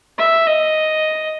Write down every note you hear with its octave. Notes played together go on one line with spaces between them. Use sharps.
E5
D#5